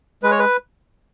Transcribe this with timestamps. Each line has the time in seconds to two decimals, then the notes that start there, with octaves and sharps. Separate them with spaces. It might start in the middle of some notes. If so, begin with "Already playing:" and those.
0.23 G#3 B4
0.31 C#5
0.39 B4